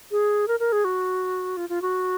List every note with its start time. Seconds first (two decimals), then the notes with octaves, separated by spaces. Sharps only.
0.11 G#4
0.48 A#4
0.60 A#4
0.72 G#4
0.85 F#4
1.57 F4
1.69 F4
1.82 F#4